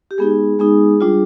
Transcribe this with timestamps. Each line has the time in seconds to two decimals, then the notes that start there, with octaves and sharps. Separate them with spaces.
0.11 G4
0.18 G#3 B3 D#4 G#4
0.59 G#3 B3 D#4 G#4
1.01 G3 D4 F4